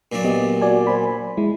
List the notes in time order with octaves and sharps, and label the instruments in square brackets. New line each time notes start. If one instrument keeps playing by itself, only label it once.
[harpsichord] A#2 F#3 D4
[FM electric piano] B3 G4 D#5
F#4 D5 G#5
C5 G#5 B5
G#3 E4